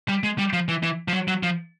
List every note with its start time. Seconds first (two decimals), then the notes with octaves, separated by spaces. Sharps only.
0.09 G3
0.23 G#3
0.38 G3
0.53 F3
0.68 E3
0.83 E3
1.08 F3
1.13 F#3
1.28 F#3
1.43 F3